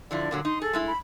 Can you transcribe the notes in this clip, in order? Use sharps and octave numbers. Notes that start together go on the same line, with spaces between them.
D3 F3 E4 D5
A#2 D3 F#3
D#4 C6
G#4 A4
G#3 A3 E4
B5